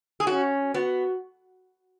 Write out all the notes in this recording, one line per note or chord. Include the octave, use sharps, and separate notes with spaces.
G#4
C#4 F#4
B3 F#4